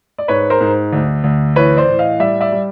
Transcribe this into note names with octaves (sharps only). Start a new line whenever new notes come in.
D5
G#2 B4 C#5
A#4 C5
G#2
D2
D2
E3 B4 C#5
C5 D5
A2
D#5 F5
G3 D5 E5
D5 E5
G3